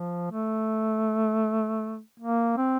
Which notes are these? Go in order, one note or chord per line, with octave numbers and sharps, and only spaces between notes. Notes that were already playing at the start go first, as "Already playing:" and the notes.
Already playing: F3
A3
A#3
C4